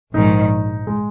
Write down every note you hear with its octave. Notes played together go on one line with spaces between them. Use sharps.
A#1 G#2 D#3 D#4
G#3